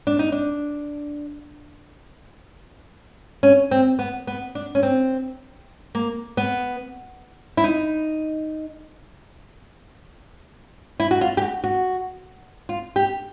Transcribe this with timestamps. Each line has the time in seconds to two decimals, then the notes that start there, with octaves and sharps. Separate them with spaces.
0.07 D4
0.19 D#4
0.32 D4
3.43 C#4
3.71 C4
3.99 B3
4.27 B3
4.55 D4
4.75 C#4
4.83 C4
5.95 A#3
6.37 B3
7.57 E4
7.64 D#4
11.00 E4
11.11 F#4
11.21 F4
11.37 G4
11.42 F#4
11.64 F#4
12.69 F4
12.96 G4